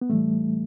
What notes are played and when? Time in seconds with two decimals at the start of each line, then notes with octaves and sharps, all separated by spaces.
0.02 B3
0.09 A2 E3 G3 A3